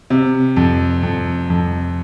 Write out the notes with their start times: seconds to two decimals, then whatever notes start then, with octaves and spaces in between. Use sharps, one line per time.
0.10 C3
0.56 F2
1.03 F2
1.50 F2